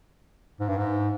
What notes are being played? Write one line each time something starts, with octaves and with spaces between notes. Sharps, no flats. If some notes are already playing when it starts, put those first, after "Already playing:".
G#2
G2
G#2